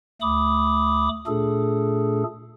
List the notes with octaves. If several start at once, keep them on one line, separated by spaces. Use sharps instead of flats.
D2 A3 B5 D6 D#6
A#2 A3 D4 G#4 A4